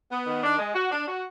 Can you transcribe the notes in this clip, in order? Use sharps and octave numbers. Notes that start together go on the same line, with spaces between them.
B3
D#3
D4
G#3
F#4
D4
F#4